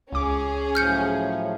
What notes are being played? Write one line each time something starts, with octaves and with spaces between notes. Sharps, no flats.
C#2 C#4 G#4 D6
A2 F3 F#3 F6 G6 C#7